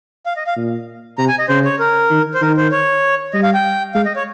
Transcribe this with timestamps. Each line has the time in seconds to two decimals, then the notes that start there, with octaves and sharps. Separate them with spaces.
0.26 F5
0.36 D#5
0.47 F5
0.57 A#2
1.18 C3 A#5
1.28 G#5
1.39 D#5
1.48 C#3 C5
1.65 C#5
1.79 A#4
2.11 D#3
2.34 C5
2.41 D#3 A#4
2.57 C5
2.72 C#5
3.33 G3 D#5
3.43 F5
3.54 G5
3.94 G#3 F5
4.05 D#5
4.16 C#5